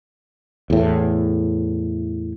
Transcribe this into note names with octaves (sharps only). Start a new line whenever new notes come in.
E2 A2